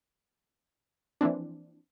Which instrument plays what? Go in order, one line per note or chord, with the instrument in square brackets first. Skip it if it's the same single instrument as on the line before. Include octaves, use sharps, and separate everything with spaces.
[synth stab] E3 F3 A#3 C4 D4